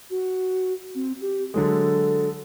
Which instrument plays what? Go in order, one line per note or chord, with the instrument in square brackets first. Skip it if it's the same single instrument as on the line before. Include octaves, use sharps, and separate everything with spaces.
[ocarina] F#4
C4
G4
[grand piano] D3 F#3 G#3 [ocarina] A4